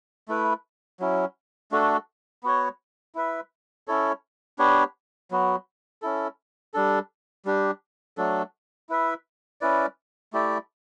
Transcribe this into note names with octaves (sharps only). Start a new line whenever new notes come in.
A3 E4 B4
F#3 C#4 E4
A3 D4 F#4 A4
B3 F#4 C#5
E4 B4 E5
C#4 E4 A4 C#5
B3 D4 G4 C#5
F#3 B3 F#4
C#4 E4 A4
G3 D4 A4
G3 D4 G4
F#3 A3 D4 A4
E4 B4 E5
C#4 E4 B4 D5
A3 E4 G4 D5